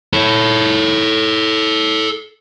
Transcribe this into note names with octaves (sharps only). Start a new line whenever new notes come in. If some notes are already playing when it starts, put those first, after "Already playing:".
A4 C#5